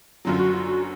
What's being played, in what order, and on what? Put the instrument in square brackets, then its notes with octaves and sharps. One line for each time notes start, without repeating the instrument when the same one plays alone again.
[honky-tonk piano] F#1 F#2 D3 F#3 [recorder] F4
[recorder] F#4
F4
F#4